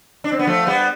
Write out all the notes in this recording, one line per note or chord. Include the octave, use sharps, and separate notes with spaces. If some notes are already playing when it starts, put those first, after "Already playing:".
D4
C4
B3
F3 A3
G3 B3